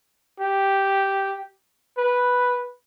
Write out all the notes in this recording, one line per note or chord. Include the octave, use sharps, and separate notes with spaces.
G4
B4